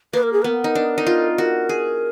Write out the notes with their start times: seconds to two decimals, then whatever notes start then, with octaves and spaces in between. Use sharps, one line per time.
0.13 A#3 B4
0.23 A#4
0.33 G#4
0.42 B3 A#4 B4
0.64 D#4
0.75 D4
0.98 D#4
1.07 F4
1.37 F#4 A#4
1.69 G#4